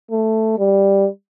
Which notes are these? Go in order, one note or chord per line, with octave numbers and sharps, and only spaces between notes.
A3
G3